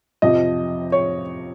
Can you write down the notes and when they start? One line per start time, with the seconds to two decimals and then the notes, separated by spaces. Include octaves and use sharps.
0.22 F2 C3 F3 D#5
0.92 C#5